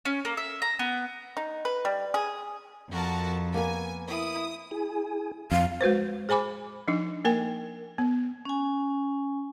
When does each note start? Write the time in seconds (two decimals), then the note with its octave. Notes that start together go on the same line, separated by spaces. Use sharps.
0.05 C#4
0.25 A#3
0.37 E5
0.62 A#5
0.79 B3
1.37 D#4
1.65 B4
1.85 G3
2.14 G#4
2.89 F2 F#4 A#4 A5
3.54 A#3 B3 A#4 G#5
4.09 E4 D#6
4.71 E4 G#4 G#5
5.52 F2 F5
5.81 G#3 F#4 B4 C5
6.29 G#4 C5 G#5 B5 D6
6.88 F3 D4 D#4
7.25 A#3 A#4 G5 G#5
7.98 B3
8.45 C#4 G#5